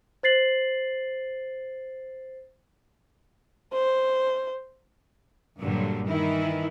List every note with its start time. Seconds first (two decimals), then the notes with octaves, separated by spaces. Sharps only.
0.23 C5 A6 C7 F#7
3.73 C5
5.59 G2 A#2 D3 F#3 G3
6.06 D#3 E3 E4